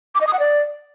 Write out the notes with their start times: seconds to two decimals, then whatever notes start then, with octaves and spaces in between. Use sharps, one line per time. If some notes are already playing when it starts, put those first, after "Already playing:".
0.15 D6
0.21 D#5
0.27 D#6
0.33 F#5
0.39 D5